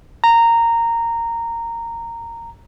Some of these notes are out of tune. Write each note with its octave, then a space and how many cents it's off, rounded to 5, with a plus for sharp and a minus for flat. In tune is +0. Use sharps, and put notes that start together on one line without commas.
A#5 -15